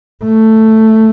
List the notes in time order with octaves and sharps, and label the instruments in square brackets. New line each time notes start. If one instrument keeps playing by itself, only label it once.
[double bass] A3